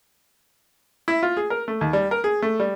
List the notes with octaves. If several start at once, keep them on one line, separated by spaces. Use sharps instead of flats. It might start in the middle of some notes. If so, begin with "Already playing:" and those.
E4
F4
G#4
A#4
A3
D#2
G3
A#4
G#4
A3
G3